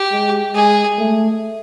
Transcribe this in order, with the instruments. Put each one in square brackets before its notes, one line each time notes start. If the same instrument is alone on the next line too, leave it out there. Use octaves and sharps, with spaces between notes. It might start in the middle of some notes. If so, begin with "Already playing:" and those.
Already playing: [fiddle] G4
[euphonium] G#3
[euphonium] G#3 [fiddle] G#4
[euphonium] A3